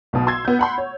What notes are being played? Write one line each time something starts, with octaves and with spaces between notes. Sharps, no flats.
B1 B2
C6 E6 G#6
B3 G6
F#5 B5 C6
C#5